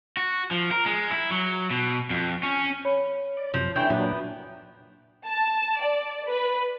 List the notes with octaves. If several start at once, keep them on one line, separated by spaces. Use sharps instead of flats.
F#4
F3
A#4
G#3
E4
F#3
B2
F2
C#4
C#5 B5
D5
F#2 C3 F3
E3 A3 D4 G5
A#2 F#3 B3 D4
A5
D5
B4